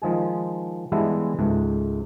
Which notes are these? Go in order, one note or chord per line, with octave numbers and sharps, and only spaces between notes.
D#3 F3 G#3 G#4
E3 G3 G#3 B3 D4 E4
C#2 G#2 A3